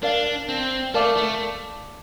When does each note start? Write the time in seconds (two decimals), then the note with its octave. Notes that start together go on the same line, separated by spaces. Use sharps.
0.02 D4 A#4 D5 F5
0.49 C4
0.94 A3 A#4 D5 F5 A5 D6
1.17 A3